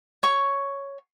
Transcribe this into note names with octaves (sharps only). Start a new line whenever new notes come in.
C#5 C#6